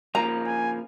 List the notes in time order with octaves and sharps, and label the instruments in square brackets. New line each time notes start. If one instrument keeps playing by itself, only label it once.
[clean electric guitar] C#3 F3 A#3 [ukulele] A#5
[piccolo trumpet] G#5